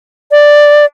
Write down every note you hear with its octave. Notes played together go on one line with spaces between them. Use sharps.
D5